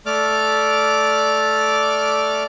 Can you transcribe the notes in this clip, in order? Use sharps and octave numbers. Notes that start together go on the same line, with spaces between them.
A3 D5 D6 F6